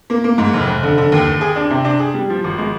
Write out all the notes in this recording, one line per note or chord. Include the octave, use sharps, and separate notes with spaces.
A#3
A#3
G#2
F1
F1
D3
D3
D#2
D#2
G#4
D4
C3
D4
G#4
G3
F3
G#1
G#3